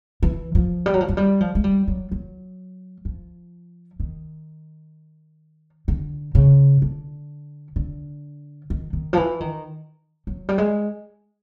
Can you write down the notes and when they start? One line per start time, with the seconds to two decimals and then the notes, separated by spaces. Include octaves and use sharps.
0.23 E3
0.55 F3
0.86 G3
0.94 F#3
1.01 F3
1.08 F#3
1.17 G3
1.41 F3
1.55 G#3
1.64 G3
1.88 F#3
2.11 F#3
3.05 F3
4.00 D#3
5.88 D3
6.35 C#3
6.82 D3
7.76 D3
8.70 D#3
8.93 D#3
9.13 F3
9.17 E3
9.40 D#3
10.27 F#3
10.49 G3
10.58 G#3